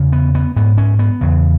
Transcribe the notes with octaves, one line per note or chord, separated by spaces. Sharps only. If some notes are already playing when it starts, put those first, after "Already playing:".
Already playing: E2 C#3
B3
B3
G#2 B3
C#4
B3
E2 C#3